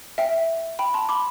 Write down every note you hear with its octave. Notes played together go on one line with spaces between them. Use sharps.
E5 G5
G5 B5
A5 C6
B5 D6